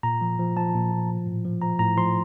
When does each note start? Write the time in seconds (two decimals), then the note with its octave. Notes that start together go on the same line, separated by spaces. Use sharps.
0.03 A#2 A#5
0.21 F3
0.39 F3
0.57 F3 A5
0.75 A#2
0.91 A#2
1.10 F3
1.26 A2
1.45 F3
1.62 F3 A#5
1.79 A2 A#5
1.97 F3 C6